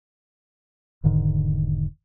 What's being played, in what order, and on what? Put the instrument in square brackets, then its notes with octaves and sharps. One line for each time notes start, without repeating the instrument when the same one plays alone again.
[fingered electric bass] E1 G#2 D3 D#3